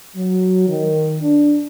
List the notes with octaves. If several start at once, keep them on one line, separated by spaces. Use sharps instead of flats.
F#3
D#3
D4